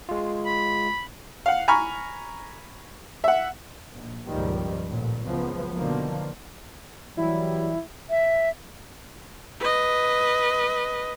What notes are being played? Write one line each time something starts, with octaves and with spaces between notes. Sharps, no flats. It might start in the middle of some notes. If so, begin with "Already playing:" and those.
G#3 F4
B5
F5 F#5
G#5 A#5 B5 C#6 F6
E5 F#5
A#1 A#2
C#2 G2 A#2 D#3 F3 G3
A1 A#2
F#1 C#2 F#2 F3 B3
B2 D3 D#3 F3 A#3
E3 F#3 G3 E4
E5
B4 D#5